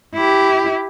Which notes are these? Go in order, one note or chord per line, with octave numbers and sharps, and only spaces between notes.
E4 G4